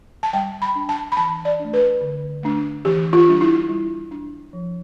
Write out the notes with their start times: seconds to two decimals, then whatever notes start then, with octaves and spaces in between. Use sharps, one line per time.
0.23 A5
0.33 G3 G5
0.62 B5
0.75 D4
0.89 A5
1.12 B5
1.17 E3 A5
1.45 D5
1.59 A3 D4
1.73 B4
2.01 D3
2.43 A3 D4
2.85 E3 G4
3.13 F4
3.28 G3 D4
3.41 E4
3.69 G3
4.11 D4
4.53 F3